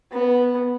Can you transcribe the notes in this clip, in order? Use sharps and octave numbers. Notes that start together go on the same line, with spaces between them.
B3